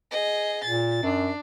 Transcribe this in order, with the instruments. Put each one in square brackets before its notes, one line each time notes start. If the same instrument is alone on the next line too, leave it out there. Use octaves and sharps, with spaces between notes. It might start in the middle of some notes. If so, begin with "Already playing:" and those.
[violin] G#4 D#5
[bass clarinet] A#2 [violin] A6
[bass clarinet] F#2 [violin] D4